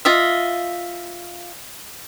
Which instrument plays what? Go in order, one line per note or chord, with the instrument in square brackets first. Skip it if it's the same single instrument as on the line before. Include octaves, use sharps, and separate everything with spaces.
[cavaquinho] F4 D#5 E5